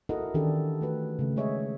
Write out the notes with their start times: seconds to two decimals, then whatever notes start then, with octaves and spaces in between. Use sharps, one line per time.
0.09 E4 F#4 A4 A#4 D#5 F#5
0.34 D#3 E3 C#4 D4 G4 A4
0.81 A3 F#4 B4
1.19 C#3 A3
1.36 G#3 G#4 C#5 D#5 E5